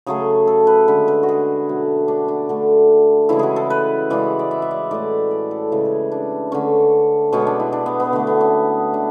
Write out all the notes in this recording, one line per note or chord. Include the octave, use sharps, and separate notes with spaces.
C#3 F#3 A3 G#4
A4
B4
D3 G#3 B4
B4
F#4
G#4
B2 F#3 A3
D4
D4
D3 A3
C#3 E3 G#3 E4
F#4 G#4
A4
B4
C#3 E3 G#3 D5
D5
E5
E5
D5
A2 G#3 D5
D5
A4
C#3 E3 G#3 A4
G#4
D4
D3 A3 C#4
B2 G#3 C#4
D4
E4
D4
B3
B3
D3 A3 B3
B3
C#4
D3 G#3 D4